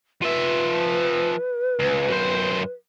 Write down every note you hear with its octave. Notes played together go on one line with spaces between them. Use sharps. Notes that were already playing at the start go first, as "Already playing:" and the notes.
F3 B4 E5
C#2
F#2 C5